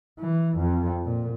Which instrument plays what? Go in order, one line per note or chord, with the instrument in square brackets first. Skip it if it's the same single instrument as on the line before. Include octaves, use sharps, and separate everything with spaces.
[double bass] E3
F2
A#2